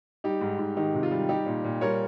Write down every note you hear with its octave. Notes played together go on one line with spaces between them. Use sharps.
G3 D#4 G4
G#2
G#2
D#3 D#4 G4
C3
F4
G3
G3 D#4 G4
A#2
A#2
G3 A#4 C#5